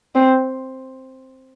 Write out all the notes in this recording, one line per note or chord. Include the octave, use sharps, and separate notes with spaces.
C4